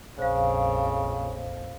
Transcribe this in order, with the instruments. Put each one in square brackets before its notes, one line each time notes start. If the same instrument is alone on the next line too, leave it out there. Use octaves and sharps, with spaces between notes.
[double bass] A#1 F2 [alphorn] C#3 [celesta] C5 F5